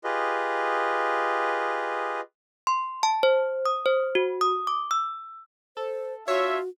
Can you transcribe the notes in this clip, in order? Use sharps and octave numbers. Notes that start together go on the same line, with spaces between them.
F4 G4 G#4 B4 D#5
C6
A5
C5
D#6
C5
F#4
D#6
D6
E6
A4 C5
D4 F4 F#4 C#5 E5